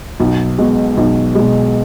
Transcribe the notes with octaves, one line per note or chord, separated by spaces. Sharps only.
B1
B2 G#3
B1
B2 G#3